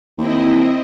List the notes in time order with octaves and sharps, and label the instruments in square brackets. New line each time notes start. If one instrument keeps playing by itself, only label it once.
[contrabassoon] D#2 [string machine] C4 E4 D#5